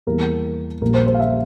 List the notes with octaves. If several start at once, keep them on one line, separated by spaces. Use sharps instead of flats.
E2 E3 G3 A#3 A#4
A#1 A#2 G3 A#3 A#4
C5
C5
F5
E5